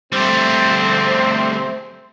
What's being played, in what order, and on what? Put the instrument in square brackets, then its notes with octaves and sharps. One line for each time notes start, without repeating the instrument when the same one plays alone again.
[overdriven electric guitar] G3 A3 [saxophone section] C4